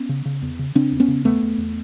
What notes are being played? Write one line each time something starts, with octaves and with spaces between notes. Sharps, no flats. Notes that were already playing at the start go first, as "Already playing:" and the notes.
Already playing: B3 C#4
C#3
C#3
E2
C#3
C#3 C4 D4
E2
B3 C#4
C#3
E2 A3 B3
E2
E2